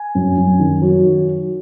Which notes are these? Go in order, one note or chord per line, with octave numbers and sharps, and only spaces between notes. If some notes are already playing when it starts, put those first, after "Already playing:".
Already playing: G#5
F#2
F#2
D#3
F#3